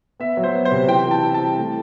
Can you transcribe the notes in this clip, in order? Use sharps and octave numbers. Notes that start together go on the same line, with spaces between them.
B3 E5
F#3
C5
B3
C5
C3
E3 G5
E3
A5
C4
A5
G3
A3